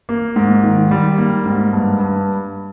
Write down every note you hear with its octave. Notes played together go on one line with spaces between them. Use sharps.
A#3
G#2
D#3
G3
A#3
G#2
G2
G2